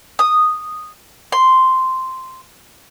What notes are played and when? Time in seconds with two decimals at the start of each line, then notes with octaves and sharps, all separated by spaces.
0.19 D#6
1.32 C6